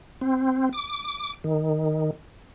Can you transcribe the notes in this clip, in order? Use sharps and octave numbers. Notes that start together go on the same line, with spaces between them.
C4
D6
D#3